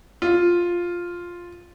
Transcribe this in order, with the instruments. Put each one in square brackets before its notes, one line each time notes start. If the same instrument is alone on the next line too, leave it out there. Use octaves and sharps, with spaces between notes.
[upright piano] F4